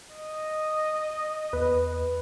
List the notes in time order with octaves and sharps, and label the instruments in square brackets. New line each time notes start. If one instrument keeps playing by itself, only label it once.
[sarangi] D#5
[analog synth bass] E2 [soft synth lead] B4